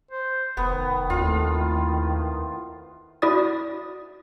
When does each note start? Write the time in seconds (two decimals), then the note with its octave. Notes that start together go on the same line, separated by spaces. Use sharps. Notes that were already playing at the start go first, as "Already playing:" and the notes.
0.11 C5
0.57 F1 D#3 B3
1.10 D#2 A2 C3 A3 F4
3.22 E4 F#4 D5 D#6 A6